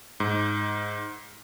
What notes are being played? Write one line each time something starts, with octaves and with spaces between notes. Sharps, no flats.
G#2